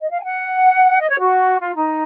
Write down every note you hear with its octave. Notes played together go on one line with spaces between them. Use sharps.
D#5
F5
G#5
F#5
D#5
C#5
F#4
F4
D#4